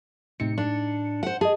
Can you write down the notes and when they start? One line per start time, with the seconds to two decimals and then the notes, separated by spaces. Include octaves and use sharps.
0.40 A2 C3 D#4 C#7
0.58 D4
1.23 C5 F#5
1.41 G#4 D#5 A5